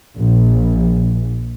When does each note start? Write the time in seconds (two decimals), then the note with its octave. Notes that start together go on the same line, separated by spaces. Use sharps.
0.18 A#1